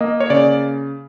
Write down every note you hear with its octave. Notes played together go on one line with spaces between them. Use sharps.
A#3 D#5
C#5
C#3 D5